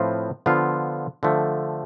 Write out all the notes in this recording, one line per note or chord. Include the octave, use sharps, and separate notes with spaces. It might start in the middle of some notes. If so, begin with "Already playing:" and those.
Already playing: A2 F3 C4 F4 B4
D3 F3 B3 F4
D3 F3 A3